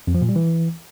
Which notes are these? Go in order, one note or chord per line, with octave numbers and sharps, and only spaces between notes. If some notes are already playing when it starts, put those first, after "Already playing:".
F2
F3
A#2
G3
E3